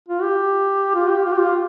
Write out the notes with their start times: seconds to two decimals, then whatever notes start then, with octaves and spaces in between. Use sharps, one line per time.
0.08 F4
0.23 G4
0.95 F4
1.10 G4
1.25 F4
1.33 G4
1.38 F4